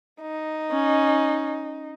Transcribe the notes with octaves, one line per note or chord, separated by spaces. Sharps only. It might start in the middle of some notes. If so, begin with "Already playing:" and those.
D#4
C#4